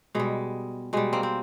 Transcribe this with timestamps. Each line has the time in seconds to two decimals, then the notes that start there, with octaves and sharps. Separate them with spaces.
0.15 B2 G3 G#3
0.93 B2 G3 G#3
1.13 A#3 C4
1.23 C4